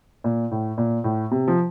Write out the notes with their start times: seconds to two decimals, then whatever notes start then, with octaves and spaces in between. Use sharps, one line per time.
0.24 A#2
0.51 A2
0.78 A#2
1.04 A2
1.31 C3
1.48 F3